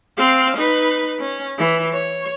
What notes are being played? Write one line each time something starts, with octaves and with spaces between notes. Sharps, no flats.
C4 F5
D#4 B4
C#4
E3
C#5